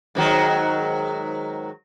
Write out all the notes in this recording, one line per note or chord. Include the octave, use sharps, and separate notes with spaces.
G#2 D#3 F#3